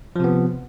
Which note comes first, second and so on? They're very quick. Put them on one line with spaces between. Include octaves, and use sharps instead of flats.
F3 C3 B3